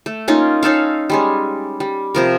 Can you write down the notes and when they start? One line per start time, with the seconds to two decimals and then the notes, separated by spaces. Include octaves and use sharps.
0.06 A3
0.28 A#3 C#4 D#4 F4
0.63 C#4 D#4 A4 F5
1.10 G3 G#3 C#4
1.80 G3
2.15 C3 F3 A#4